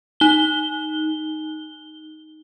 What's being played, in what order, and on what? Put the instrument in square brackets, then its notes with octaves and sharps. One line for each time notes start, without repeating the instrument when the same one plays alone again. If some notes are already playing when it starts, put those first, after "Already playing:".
[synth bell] D#4 G7